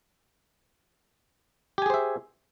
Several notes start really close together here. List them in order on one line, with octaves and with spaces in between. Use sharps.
G4 G#5 G#4 C5 E5